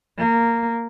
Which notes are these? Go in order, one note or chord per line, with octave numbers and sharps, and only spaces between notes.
A#3